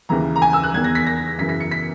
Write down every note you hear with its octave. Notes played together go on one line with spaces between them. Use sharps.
D#2 C#3 E3 A#5
A#5
G#5
E6
F#6
E2 D#3 G#6
A#6
B6
A#6
F#2 C#3 E3 B6
B6
C#7
B6